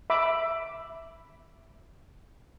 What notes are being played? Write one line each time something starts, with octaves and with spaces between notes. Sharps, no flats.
E5 B5 D6